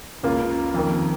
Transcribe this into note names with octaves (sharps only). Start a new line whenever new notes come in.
C#2 C#3 A#3 F4
F2 D#3 A#3